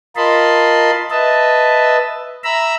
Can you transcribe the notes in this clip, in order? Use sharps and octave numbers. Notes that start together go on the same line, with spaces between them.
F4 A#4 D#5 A5 B5 C6
B4 D#5 E5 A5
E5 A#5 B5 E6